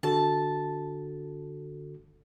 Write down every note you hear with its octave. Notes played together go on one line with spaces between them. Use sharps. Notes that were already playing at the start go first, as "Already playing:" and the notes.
D3 F#4 A4 A5